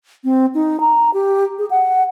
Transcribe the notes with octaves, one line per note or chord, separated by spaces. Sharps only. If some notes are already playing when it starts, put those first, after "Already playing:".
C4
D#4
A#5
G4
G#4
F#5